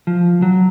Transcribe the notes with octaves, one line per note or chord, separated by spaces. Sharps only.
F3
F#3